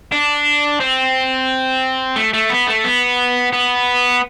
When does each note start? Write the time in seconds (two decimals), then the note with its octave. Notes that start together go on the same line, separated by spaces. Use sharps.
0.12 D4
0.80 C4
2.16 A3
2.34 A3
2.50 B3
2.67 A3
2.84 B3
3.52 B3